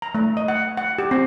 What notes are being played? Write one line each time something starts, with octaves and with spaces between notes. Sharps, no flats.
A#5
A3
D#5
F#5
F#5
G4
C4